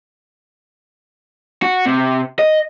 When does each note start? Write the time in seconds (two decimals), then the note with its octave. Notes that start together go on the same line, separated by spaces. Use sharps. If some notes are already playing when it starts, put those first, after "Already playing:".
1.62 F#4
1.86 C3
2.39 D#5